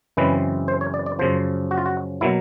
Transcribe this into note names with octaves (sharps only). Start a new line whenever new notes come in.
F#2 C#3 E3 G#3 C4 B4
C5
C#5
D5
D5
F#2 C#3 F3 C5
F#4
F4
F#4
B2 F#3 A#3 E4